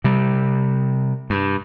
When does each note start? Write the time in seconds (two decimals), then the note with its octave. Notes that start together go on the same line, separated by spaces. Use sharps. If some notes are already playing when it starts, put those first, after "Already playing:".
0.04 C3 G3
1.30 G2